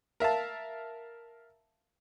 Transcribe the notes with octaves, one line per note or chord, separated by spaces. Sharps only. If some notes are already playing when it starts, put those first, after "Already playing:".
A#4 E5 F5 A5